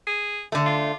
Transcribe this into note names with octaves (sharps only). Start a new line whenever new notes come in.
G#4
D3 A3
F4